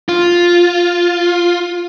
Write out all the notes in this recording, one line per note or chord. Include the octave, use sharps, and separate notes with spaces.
F4